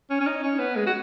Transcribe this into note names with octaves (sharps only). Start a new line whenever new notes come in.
C#4
C#4
D#4
C#4
B3
G#3
F#4